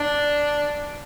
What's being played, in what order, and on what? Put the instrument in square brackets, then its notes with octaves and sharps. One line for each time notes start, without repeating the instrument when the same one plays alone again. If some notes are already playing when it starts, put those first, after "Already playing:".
Already playing: [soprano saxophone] D4